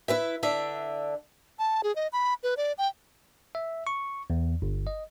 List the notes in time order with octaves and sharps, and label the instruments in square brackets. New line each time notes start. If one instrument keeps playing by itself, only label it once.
[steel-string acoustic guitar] E4 B4 E5
D3 D4 E5
[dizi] A5
G#4
D#5
B5
B4
D5
G5
[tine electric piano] E5
C#6
E2
G1
D#5